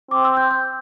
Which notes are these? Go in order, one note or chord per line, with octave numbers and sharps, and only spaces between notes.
C4 D6
E6
G6
G6